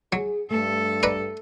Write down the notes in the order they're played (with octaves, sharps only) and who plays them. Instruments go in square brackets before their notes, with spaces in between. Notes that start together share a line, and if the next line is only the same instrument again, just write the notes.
[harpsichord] F#3 [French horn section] G#4
[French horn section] G2 [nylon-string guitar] A3 [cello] A4
[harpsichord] B4 D5 A#5